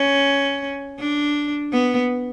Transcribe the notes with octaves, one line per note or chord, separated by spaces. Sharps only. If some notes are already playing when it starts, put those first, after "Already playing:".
Already playing: C#4
D4
B3